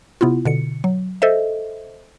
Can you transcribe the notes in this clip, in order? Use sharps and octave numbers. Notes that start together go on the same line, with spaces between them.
C3 B3 E4 F4
B2 D3 C#7
F#3
A4 C5 D#5 E5